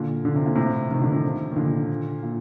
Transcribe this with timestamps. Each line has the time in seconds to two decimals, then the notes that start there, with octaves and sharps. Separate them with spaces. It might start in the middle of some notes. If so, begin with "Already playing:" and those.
Already playing: A#2 D3
0.25 D3
0.36 C3
0.46 A#2
0.55 A2 C3
0.91 C3 D#3
1.02 D3 F3
1.13 C3 D#3
1.51 D#3
1.56 A#2 D3
2.23 A#2